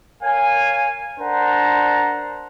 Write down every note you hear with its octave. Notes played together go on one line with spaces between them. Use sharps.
A#4 C#5 F5 G#5
D4 A#4 C5 F#5 A5 A#5